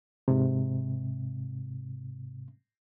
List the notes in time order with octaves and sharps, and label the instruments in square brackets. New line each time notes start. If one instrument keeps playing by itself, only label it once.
[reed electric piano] G#2 C3